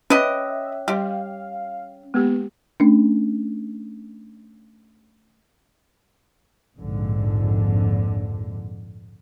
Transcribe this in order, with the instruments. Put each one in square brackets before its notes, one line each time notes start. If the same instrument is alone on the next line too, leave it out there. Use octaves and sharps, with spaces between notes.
[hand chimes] C#4 [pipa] B4 D#5 [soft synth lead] E5
[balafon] G3 C#5 C6 [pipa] G4 [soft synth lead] F5
[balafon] G#3 A#3 G4 [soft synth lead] B3
[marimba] A3 C#4 D4
[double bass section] A#1 F2 G#2 D3